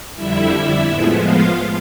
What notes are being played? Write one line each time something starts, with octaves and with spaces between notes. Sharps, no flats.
F2 D3 G3 E4 E5
A2 F3 G#3 B3
F4 F5